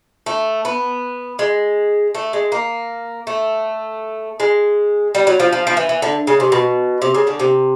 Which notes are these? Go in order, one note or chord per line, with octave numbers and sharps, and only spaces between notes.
A3
B3
G#3
A3
G#3
A#3
A3
G#3
G3
F#3
F3
F3
F3
E3
E3
D3
C#3
C3
B2
C3
C#3
D3
C3